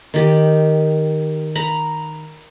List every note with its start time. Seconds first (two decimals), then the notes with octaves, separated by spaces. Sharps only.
0.14 D#3 G4
1.55 A#5 B5